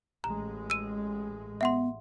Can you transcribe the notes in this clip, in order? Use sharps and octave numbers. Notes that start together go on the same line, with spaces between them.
A1 G#3 A#5
E6 D#7
B3 E5 F#5 C6